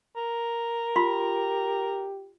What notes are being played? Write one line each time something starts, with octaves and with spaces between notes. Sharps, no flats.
A#4
F4 G4 C6